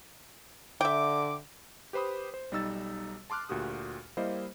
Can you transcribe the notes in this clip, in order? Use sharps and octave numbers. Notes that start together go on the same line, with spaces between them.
D3 E5 G5 D6
G4 B4 C5 B5 D#6
C5
B1 G3 D#4 E6 A6
A5 C6 D6 F6 F#6
D2 A#2 F#4 G4 D#6
G3 A#3 E4 C5 D#5 F5